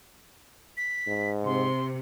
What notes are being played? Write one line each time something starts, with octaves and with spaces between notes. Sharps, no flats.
B6
G#2
C3 C6